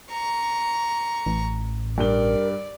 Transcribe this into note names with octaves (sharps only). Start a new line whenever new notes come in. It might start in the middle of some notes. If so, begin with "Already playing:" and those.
A#5 C#6
A1
G2 A#4 D5 G7